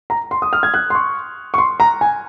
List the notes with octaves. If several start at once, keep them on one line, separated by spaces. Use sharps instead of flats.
A#5
C6
D#6
F6
G#6
F#6
C6
C#6
C#6
C6
A#5
G#5